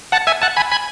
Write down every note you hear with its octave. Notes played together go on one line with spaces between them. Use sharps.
F#5 A5
E5 G#5
F#5 A5
G#5 B5
G#5 B5